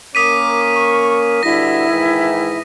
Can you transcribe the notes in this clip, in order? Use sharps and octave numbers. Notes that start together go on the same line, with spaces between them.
A#3 C#4 A#4 D6 D#6 B6 D#7
C#6
G2 B2 D3 E4 A#6
G#2 D#3 E3